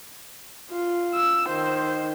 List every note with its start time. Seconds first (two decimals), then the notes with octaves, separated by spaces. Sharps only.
0.71 F4
1.14 E6
1.49 D#3 C5